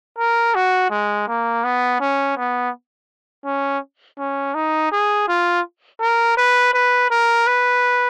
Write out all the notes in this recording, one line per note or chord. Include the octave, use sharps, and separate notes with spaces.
A#4
F#4
G#3
A#3
B3
C#4
B3
C#4
C#4
D#4
G#4
F4
A#4
B4
B4
A#4
B4